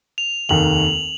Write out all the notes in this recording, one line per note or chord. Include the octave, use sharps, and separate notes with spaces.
F7
F1 D#2 D#3 F#7